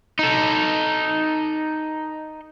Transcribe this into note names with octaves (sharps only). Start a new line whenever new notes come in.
D#4 A4